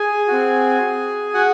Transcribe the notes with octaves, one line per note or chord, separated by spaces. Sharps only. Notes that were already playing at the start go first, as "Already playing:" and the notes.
Already playing: G#4 G#5
C4 F#4
F#4 F#5